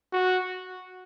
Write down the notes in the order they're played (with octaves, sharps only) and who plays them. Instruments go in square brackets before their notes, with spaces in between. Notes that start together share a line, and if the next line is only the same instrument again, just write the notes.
[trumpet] F#4